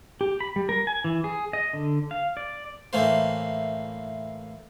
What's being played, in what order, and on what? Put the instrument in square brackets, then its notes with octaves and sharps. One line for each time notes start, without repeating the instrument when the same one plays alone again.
[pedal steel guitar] G4
B5
G3
A#4
G#5
E3
G#4
D#5
D3
F5
D5
[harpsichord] A2 E3 A#3 C5